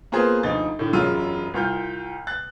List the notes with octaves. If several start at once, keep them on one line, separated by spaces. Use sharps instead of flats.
A#3 B3 F4 G#4 C5
D2 F3 D#4 A6
A2 D3
E1 F#2 G#3 F4 E6 D#7
C2 F4 F6 G6
F#6 A6